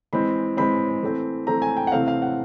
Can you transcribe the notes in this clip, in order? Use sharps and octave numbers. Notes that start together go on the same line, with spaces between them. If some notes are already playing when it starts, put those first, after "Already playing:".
E3 G#3 C4 B5
E3 G#3 C4 B5
E3 A3 C4
E3 A3 C4 A#5
G#5
G5
F#5
C3 E3 A3 C4 F5
F5
F#5